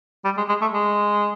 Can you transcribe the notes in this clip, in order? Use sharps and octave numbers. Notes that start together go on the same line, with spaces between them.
G3
G#3
G#3
A3
G#3